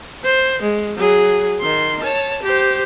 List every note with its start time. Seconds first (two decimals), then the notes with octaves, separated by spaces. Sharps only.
0.24 C5
0.62 G#3
0.97 F#3 G#4
1.60 D#3 C6
2.03 C#5 A5
2.43 G4 C5